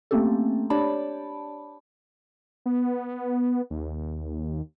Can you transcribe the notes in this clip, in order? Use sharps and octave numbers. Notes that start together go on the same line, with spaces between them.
A3 A#3 C4 C#4 G4 A4
D4 G4 C#5 D5 A5 B5
B3
D#2